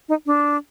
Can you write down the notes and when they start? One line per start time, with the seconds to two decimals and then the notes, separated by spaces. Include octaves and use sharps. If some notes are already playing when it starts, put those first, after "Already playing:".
0.09 D#4
0.26 D4